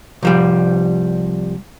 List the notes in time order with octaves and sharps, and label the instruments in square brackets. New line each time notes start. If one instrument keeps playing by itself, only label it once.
[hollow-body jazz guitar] C2 F3 G3